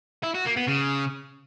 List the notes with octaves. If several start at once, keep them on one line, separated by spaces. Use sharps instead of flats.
E4
F#4
A#3
B3
C#3